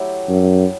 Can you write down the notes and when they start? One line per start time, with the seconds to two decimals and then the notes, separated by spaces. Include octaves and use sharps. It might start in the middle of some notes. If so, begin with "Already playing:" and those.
Already playing: F#3 A3 E4 G4
0.29 F#2